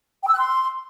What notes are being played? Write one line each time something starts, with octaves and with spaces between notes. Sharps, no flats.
G5
E6
F#6
C6